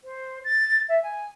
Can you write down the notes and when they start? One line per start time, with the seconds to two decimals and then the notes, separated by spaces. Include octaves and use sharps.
0.04 C5
0.44 A6
0.89 E5
1.03 G#5